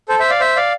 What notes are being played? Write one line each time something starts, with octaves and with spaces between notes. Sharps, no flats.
A4 C5
C5 E5
D5 F5
C5 E5
D5 F5